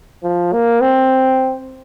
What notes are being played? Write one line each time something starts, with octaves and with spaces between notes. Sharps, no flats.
F3
A#3
C4